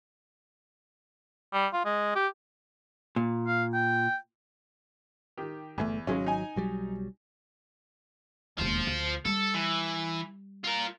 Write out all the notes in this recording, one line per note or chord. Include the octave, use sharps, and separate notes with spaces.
G3
F4
G#3
G4
A#2
F5
G5
D#3 G4
G1 E2 D3 A3
G#1 C#3 F#3 G#3 C#4
D#4 G#5
B1 F#3 G3
E1 D#2 F4 C5
D2
G3 A4
E3
F4 A#4